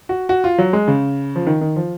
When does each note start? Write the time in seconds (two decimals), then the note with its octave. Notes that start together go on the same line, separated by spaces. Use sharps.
0.09 F#4
0.29 F#4
0.44 F4
0.58 F#3
0.73 G#3
0.88 C#3
1.36 F3
1.47 D#3
1.61 D#3
1.76 F3